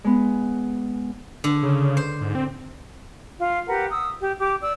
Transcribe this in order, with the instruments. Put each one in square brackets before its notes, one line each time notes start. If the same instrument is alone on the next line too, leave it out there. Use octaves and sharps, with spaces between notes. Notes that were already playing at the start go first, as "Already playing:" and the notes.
[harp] G#3 B3
[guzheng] D3
[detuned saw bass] C#3
[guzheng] C5
[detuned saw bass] G#2
C4
[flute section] F4
G4 A#4 B4 F#5
D#6 E6
G4
G4 D6
D5 E6